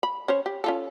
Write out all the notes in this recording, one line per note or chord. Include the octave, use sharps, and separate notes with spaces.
B5
C#4 C5 C#5
G4
C#4 F4 A4